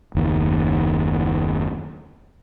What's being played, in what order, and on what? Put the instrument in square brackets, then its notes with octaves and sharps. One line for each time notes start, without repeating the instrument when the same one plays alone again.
[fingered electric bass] F#1 D#2